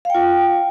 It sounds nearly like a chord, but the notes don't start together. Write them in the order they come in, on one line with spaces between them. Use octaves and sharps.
F5 G5 F4